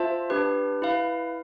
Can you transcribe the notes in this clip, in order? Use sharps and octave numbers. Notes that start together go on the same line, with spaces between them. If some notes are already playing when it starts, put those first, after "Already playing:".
Already playing: F4 C5 E5 A5
D4 G4 B4
E4 B4 F5